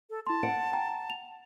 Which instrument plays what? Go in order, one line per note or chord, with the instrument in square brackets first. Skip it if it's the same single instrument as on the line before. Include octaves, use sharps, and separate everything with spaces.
[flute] A4
[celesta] E4 C6 [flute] A5
[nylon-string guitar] F#5 [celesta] D7
[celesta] G5 A#5
F7